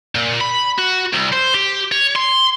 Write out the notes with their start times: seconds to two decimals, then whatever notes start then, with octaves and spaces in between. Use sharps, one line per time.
0.15 A#2
0.41 B5
0.78 F#4
1.13 C2
1.33 C5
1.55 G4
1.92 C#5
2.16 C6